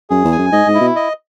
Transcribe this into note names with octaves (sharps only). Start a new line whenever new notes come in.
F#2 G#4
E2
G#5
F#2
G#2 D#5
G#2
E4
B2
D#5